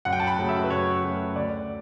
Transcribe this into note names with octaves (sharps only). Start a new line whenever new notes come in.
F#2 F#5
G5
A5
B5
C#3 F#3 A3 C#4
E5
B4
F#2 C#5
C#3 F#3 A3 C#4
D2 D5